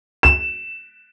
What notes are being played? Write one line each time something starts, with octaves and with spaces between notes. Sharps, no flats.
E7